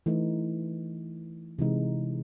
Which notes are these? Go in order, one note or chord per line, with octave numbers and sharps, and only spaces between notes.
E3 A3 D#4
C3 E3 G#3 D#4